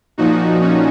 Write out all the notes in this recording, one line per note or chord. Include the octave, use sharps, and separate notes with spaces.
A#2 F3 D#4 F#4
C#4